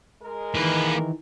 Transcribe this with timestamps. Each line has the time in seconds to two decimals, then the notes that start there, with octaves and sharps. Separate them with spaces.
0.22 G#3 A#4
0.55 D#3 E3 A#3 B4